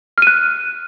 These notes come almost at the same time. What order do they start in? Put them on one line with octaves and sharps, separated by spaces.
F6 D#7 F#6